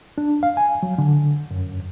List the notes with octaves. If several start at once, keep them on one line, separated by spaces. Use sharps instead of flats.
D4
F5
G#5
F#3
D3
F#2